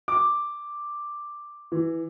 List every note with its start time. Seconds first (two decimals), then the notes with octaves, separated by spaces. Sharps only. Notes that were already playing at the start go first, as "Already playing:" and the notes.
0.08 D6
1.72 E3